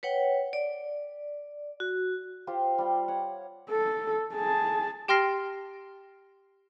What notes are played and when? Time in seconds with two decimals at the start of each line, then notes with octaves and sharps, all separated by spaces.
0.03 B4 C#5 F#5 G5
0.53 D5
1.80 F#4
2.47 F4 G4 C5
2.78 G3 F4
3.08 C#5 F#5
3.70 A4
4.34 G#4 A5
5.08 G4 G5 C6 F6 A#6 C7